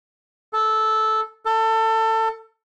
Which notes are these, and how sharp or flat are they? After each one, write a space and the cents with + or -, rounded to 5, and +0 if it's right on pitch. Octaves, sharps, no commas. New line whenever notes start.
A4 -10
A4 +25